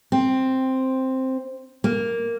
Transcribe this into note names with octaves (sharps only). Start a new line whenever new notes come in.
C4
A#3